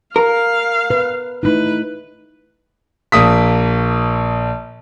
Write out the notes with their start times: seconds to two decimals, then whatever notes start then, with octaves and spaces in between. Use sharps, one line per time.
0.16 A#4 F5
0.90 B4
1.43 A3 D#4 E4 B4
3.12 A#1 A#3 D#6 B6